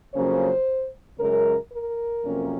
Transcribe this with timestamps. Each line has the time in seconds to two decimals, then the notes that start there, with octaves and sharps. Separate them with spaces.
0.13 F2 C#3 F#3 A#3 C#4 C5
1.18 F#2 C#3 G#3 C#4 A#4
1.71 A#4
2.23 F2 C3 F#3 A#3 C#4